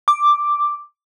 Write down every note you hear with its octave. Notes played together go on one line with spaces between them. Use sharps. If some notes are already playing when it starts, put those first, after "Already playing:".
D6